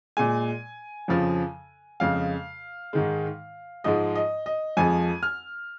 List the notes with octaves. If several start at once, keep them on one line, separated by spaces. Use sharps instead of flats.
A#2 G#3 G#5
F2 C#3 F3
F2 C#3 G#3 F5
G#2 D#3 G#3
G#2 F3 G#3 D#5
D#5
D#5
F2 F3 G#3 G#5
F6